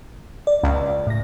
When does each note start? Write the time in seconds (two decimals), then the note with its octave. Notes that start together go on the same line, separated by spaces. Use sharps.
0.47 D5
0.63 C#2
1.07 A2 A#6